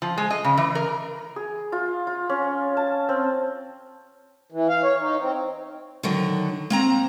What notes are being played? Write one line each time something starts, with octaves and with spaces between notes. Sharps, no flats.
F3
G#3
D#5
C#3
E3
A#4
G#4
F4
F4
C#4
A5
C4
E3
F5
C#5
D#4
C4
D3 D#3 F#3 F#4
A#3 C4 A#5